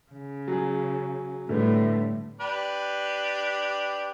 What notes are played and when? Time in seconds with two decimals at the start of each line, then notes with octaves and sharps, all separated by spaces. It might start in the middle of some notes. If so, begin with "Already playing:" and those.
0.11 C#3
0.48 F#3 G#4
1.49 A2 D3 G3 A3 B3
2.41 D4 G4 B4